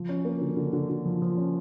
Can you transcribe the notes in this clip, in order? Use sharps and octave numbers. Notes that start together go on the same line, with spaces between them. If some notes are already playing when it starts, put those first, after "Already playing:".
Already playing: F3
C#4
A#3
D3
D3
D3
D3
F3
F3
C#4